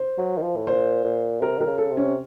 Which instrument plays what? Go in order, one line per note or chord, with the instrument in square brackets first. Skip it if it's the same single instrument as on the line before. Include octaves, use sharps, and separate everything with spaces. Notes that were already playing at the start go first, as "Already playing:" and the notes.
Already playing: [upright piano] C5
[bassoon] F#3
D#3
F3
A2
[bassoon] A#2 [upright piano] C5
[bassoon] A#2
[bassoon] C3 [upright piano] A#4
[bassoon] D#3 [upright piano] A#4
[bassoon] C#3
[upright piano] A4
[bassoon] C3
[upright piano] C#4